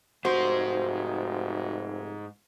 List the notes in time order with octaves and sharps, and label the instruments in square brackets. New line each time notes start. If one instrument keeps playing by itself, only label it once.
[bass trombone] F1 [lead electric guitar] G#2 C6 [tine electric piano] F#4 [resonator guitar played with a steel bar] C5